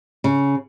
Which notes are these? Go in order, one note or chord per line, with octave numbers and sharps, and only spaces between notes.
C#3